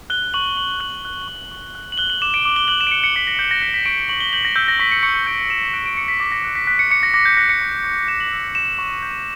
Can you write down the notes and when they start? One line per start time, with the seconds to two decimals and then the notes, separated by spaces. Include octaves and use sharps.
0.10 F#6 G7
0.34 C#6 F#7
0.57 C#6 F#7
0.80 F#6 F#7
1.05 F#6
1.28 C#6
1.51 C#6
1.75 F#6
1.92 F#7
1.98 F#6 G7
2.10 F#7
2.22 D6 E7
2.34 D7
2.45 D6
2.56 G7
2.68 F#6 F#7
2.81 E7
2.87 D7
2.91 F#6 C#7
3.04 C#7
3.16 D6 B6
3.27 A#6
3.39 D6 G6
3.51 A#6
3.62 F#6 B6
3.74 B6
3.85 C#6 D7
4.09 C#6 F#7
4.20 G7
4.33 G6 F#7
4.45 A#6
4.56 E6 G6
4.68 A#6
4.79 C#6 B6
4.92 C#7
5.03 C#6 C#7
5.15 C#7
5.27 G6 D7
5.50 E6 E7
5.73 F#6 D7
5.86 D7
5.97 D6 C#7
6.08 B6
6.20 D6 A#6
6.32 A#6
6.44 F#6
6.55 B6
6.67 F#6 B6
6.79 C#7
6.91 D6 C#7
7.03 A#6
7.14 D6 A#6
7.25 G6
7.37 F#6 A#6
7.49 C#7
7.61 C#6
7.84 C#6
8.08 G6 E7
8.20 F#7
8.32 E6
8.55 C#6 E7
8.79 C#6
9.02 G6